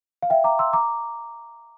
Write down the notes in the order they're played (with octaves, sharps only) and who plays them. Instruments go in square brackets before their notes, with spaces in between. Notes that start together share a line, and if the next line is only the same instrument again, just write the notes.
[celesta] F5
E5 G5
A#5 D6
C6 E6
A#5 D6